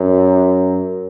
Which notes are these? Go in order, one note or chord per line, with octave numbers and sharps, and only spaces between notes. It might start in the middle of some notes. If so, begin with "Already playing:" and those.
Already playing: F#2